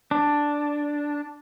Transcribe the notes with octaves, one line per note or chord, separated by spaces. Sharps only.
D4